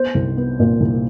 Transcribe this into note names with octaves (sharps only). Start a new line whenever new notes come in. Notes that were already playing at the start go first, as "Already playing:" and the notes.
Already playing: B3 C5
C2
B3
A#2
C2